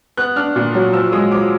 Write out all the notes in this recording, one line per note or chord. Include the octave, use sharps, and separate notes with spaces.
B3 F#6
D4 F6
A#2
F#3
F3 E6
G#3 D#6
F3 D6